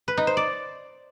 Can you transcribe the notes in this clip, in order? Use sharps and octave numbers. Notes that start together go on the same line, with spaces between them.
B4
D#4
C5
D5